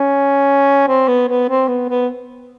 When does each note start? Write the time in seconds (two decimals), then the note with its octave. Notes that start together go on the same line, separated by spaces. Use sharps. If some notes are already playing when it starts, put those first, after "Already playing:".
Already playing: C#4
0.88 C4
1.08 B3
1.28 B3
1.49 C4
1.68 B3
1.89 B3